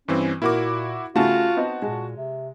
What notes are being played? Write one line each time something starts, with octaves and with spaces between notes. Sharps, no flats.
G2 E3 C4 C#4
A#2 A#3 E4 F#4 A#4 D6
C#3 A3 F4 F#4 A5
B3 C4 D#4
A#2 G#3
C3